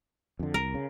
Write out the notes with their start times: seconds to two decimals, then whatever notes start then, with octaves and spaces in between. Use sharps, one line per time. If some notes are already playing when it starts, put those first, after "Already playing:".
0.39 F2 D3
0.54 C2 A#4
0.75 C#3